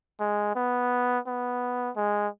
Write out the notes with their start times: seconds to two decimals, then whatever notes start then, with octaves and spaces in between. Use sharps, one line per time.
0.20 G#3
0.55 B3
1.27 B3
1.96 G#3